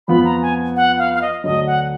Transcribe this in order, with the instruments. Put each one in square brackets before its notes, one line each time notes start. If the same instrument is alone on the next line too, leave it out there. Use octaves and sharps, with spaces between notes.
[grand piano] F2 F3 B3 F4 [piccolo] B5
[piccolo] A#5
G#5
F#5
F5
F5
D#5
[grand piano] D2 D3 F#3 [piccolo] D#5
[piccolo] F#5